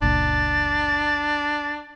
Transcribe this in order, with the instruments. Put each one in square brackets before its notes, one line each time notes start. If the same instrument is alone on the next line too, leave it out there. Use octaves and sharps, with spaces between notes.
[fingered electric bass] F#1 C#2 A#2 [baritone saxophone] D4 [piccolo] A6